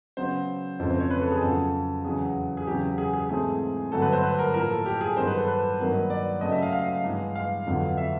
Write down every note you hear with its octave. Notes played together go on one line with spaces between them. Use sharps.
C#3 F#3 B3 C5
F2 C#3 E3 A3 C4 C5
C5
C#5
B4
A4
G#4
F2 C#3 F#3 B3 A4
E2 C#3 F#3 G#4
G#4
E2 C#3 F#3 G4
G#4
G#4
G#2 E3 A3 C4 G#4
G2 D3 F#3 A3 A4
B4
C5
B4
A#4
A2 F3 A#3 A#4
A4
G4
G#4
G2 D#3 F#3 C5
B4
A4
B4
G2 D#3 F#3 A#3
D5
C#3 F#3 A3 D#5
E5
F5
F5
F5
G2 E3 G#3 B3
F5
F2 D3 F#3 B3
E5